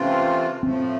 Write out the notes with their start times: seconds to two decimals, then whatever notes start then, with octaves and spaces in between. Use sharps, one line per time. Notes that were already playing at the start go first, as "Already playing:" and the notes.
Already playing: C3 E3 A3 C4 C#4 F4
0.63 A2 F3 A3 C4